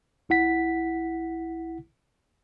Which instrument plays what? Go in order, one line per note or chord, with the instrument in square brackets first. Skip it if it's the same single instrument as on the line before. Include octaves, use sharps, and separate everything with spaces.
[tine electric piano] B1 E4 F#5 B6